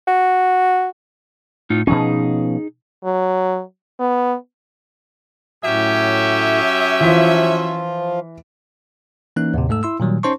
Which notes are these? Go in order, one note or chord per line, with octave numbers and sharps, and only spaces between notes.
F#4
A2 D#4 F4
B2 F3 C#4 D#4 G#4
F#3
B3
A2 F#3 C#4 G4 E5
E3 F3 F4 B6
E3 A#3 C#4 D#4 F#6
D#2 A2 C3
G#2 A3 A4 E6
E4 C6 E6
A#2 D#3 F#3 G3
C#4 D#4 C5 A5 C6 C#6